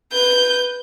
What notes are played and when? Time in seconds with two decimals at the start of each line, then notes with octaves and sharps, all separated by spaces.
0.13 B4 G6